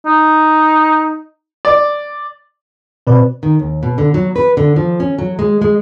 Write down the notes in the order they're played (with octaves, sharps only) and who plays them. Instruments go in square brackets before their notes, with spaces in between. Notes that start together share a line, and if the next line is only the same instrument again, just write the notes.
[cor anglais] D#4
[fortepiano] D5
[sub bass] B2 [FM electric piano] C4 B4 D5
[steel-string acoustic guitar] D#3
D#2
B2
D3
F#3
B4
D3
F3
C#4
F#3
G#3
G#3